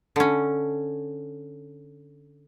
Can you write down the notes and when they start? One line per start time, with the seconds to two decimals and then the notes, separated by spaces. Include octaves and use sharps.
0.16 D3 C#4